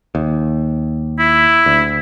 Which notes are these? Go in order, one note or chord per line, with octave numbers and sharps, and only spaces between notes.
D#2
E4
D2